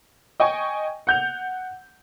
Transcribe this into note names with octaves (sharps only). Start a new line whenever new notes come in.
D#5 G5 G#5 C#6
F#5 G6 F7